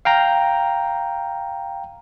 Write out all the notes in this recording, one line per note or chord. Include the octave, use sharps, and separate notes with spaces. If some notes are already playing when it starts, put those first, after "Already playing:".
F5 G5 A#5